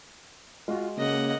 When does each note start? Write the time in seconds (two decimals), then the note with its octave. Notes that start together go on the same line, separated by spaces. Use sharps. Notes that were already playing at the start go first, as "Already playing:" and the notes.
0.68 G#3 F4 F#4
0.97 C#3 A#3 D#5 F#5